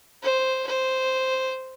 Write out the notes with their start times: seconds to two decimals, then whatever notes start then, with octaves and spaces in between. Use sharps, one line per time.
0.23 C5
0.67 C5